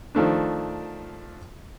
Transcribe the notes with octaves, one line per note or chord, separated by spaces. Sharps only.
D#3 F3 A3 D4